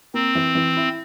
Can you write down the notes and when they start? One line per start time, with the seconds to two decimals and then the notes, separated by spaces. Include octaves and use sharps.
0.14 A#3 C4
0.35 E3
0.55 E3
0.77 E4